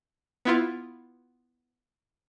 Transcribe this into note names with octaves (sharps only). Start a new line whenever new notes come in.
B3 E4 F4